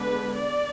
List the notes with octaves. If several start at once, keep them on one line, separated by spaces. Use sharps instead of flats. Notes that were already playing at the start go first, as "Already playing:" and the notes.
Already playing: D3 G#3 B3 D4 B4
D5